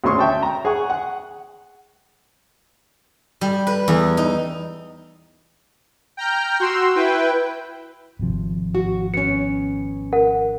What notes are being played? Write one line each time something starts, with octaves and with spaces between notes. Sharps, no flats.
D2 G#3 C#4 C6 C#6
E5 G5 A5
A#5
G#4 F#5 C#6
F#5
G3
B4
E2
D#4
G5 A#5 F6 G6
F#4 C6 E6
E4 B4 G5
G#1 C3 F3
F#4
B3 C#4 C#7
A#4 F#5